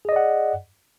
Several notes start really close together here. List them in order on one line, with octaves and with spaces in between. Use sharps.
G#4 D#5 D5 F#5